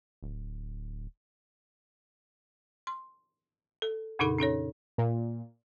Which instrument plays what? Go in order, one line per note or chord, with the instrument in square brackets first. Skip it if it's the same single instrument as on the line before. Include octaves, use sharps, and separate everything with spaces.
[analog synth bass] D1
[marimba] C6
A4
F2 A#2 C#3 D#4 A4 B5
C#4 D#4 A4 C#5
[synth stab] A#2